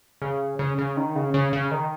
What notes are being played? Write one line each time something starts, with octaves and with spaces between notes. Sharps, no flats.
C#3
C#3
C#3
D#3
C#3
C#3
C#3
D#3